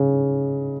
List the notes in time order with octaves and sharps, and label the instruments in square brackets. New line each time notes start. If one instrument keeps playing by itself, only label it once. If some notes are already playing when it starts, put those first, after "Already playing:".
Already playing: [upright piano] C#3